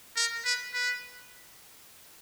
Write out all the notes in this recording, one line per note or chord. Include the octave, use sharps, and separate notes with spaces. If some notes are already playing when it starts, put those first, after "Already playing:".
A#4
B4
B4